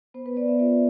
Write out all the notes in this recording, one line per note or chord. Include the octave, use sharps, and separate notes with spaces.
B3 C5
B4
B3 D5
E5
F4 D5